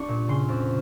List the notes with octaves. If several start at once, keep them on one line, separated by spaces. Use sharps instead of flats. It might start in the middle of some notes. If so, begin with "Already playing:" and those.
Already playing: G3 D4 C#6
A#2
C#3 C6
F2